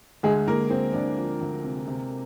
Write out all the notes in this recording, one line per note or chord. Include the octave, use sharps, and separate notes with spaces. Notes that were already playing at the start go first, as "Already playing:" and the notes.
D2 G#3 G#4
D2 A#3 A#4
D2 C4
D2 D4
F3
D2
C3
C3